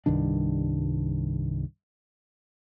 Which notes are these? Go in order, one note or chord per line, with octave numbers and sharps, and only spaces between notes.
C2 G2 D#3 D4